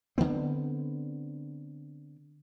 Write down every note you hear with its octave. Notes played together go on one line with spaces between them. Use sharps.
D3 E3 B3 C4